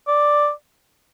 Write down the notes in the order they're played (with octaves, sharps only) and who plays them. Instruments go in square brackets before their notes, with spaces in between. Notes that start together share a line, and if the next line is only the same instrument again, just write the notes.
[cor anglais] D5